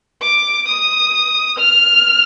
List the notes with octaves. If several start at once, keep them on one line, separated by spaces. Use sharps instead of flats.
D6
D#6
F6